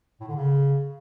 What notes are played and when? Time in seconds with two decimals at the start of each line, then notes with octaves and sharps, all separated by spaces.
0.20 A2
0.28 D3
0.36 C#3